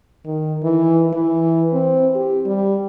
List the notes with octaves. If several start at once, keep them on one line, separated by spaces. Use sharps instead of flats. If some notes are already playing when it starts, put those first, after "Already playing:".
D#3
E3
E3
C4
G4
G3